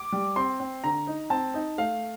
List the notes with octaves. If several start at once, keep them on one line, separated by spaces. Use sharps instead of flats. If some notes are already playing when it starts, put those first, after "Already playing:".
Already playing: D6
G3
C4 C6
C4
D3 A#5
D#4
C4 A5
D#4
A3 F5